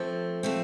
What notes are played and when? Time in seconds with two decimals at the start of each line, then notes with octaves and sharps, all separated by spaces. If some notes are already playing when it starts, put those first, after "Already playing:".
Already playing: F3 A3 C4
0.43 F3 A3 C4